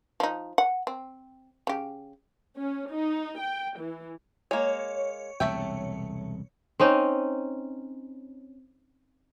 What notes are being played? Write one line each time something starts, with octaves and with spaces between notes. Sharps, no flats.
F3 D#4
F#5
C4
C#3 G4
C#4
D#4
G5
E3
G#3 A#3 C#5
E1 C2 A3 E5 G5
C4 C#4 D#4